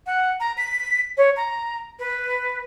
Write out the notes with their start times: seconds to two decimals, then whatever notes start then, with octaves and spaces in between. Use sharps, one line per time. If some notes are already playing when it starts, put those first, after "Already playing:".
0.07 F#5
0.40 A#5
0.58 B6
1.17 C#5
1.37 A#5
1.99 B4